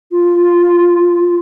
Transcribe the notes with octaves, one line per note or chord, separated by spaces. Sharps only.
F4